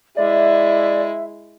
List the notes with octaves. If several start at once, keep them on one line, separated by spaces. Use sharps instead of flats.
G#3 E4 D5 E5